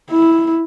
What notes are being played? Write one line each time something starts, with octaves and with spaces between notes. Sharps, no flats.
E4